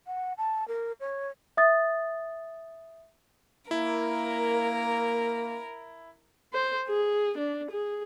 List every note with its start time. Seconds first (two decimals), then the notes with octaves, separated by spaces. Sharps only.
0.07 F#5
0.38 A5
0.68 A#4
1.00 C#5
1.57 E5 D#6 A6
3.71 A#3 E4 A#4
6.53 C5
6.88 G#4
7.38 D4
7.71 G#4